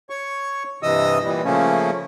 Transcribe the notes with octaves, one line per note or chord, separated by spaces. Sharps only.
C#5 C#6
G2 C3 E3 D#5 D#6 E6
A#2 E3 G3
C#3 F3 A3 A#3 C#4